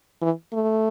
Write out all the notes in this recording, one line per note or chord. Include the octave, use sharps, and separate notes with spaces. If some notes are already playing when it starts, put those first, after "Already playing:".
E3
A3